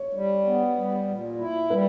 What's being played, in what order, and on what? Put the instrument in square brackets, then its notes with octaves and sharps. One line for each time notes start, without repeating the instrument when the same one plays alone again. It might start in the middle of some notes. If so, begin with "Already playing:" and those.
Already playing: [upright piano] C#5
[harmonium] G3
B3
G3
A#2
E4
[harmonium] G3 [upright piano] B4